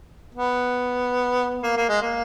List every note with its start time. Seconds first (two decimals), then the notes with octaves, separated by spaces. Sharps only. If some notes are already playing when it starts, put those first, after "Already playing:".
0.35 B3
1.63 A#3
1.76 A#3
1.89 G#3
2.02 A#3